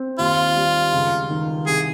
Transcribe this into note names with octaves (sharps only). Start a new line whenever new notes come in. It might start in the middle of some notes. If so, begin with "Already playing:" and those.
Already playing: C4
D#2 F4
G3
C#2
D#3
C2 G#4